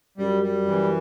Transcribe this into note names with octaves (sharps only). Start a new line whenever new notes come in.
F#2 G3
G3
F#2 E3